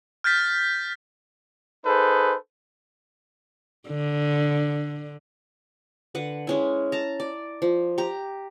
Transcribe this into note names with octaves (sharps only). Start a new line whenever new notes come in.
F6 G6 A6 B6
D#4 G#4 A4 B4 C5
D3
D3 B4 F#5
G#3 C#4 E4
A5 A#5
D5
F3
G4 A#5